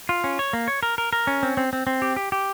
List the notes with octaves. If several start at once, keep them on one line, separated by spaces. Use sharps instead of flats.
F4
C#4
C#5
A#3
C#5
A#4
A#4
A#4
C#4
C4
C4
C4
C4
G4
G4
G4